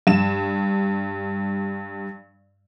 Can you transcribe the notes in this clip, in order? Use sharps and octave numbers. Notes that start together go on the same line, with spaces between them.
G2 E7